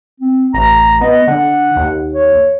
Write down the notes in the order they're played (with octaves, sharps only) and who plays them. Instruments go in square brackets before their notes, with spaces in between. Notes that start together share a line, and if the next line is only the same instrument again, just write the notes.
[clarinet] C4
[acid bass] A1 [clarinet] A#5
[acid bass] B3 [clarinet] D#5
[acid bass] D3 [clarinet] F#5
[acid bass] D#2
[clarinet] C#5